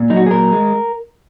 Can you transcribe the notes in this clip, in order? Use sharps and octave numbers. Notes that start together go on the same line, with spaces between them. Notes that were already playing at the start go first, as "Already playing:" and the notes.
Already playing: A#2
F#3 D#4
F#4
G#4
A#2 A#4
G#3